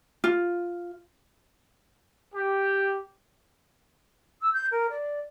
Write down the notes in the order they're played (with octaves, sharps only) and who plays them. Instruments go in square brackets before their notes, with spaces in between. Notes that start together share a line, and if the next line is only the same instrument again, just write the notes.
[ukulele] F4
[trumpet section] G4
[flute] E6
G6
A#4
D5